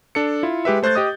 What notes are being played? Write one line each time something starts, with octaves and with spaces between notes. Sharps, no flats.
D4 A4 C#7
E4 F4
G#3 G4 B4 E5
A3 C5 F#6 G6 A6
G4 D#5 D#6